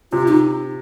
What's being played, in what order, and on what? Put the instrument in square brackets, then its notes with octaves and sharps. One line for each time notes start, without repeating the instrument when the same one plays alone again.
[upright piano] C3 [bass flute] F4
[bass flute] D#4